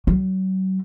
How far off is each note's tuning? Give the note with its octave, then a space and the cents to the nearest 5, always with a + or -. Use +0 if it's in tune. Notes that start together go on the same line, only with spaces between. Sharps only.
F#3 +35